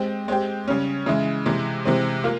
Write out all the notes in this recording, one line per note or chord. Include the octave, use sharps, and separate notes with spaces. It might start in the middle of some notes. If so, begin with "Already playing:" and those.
Already playing: G#3 C4 G4
G#3 C4 G4
C#3 G3 C#4
C#3 E3 G#3 E4
C3 E3 G#3
C3 E3 G#3 C4
A#3 F4